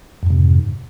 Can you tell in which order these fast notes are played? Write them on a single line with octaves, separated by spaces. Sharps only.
F2 G#2 C3